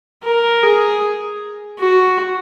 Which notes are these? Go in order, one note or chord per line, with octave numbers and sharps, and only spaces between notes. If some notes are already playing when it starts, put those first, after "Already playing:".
A#4
G#4
F#4